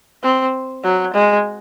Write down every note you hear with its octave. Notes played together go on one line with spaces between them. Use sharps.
C4
F#3
G#3